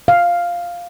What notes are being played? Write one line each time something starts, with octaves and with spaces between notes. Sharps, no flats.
F5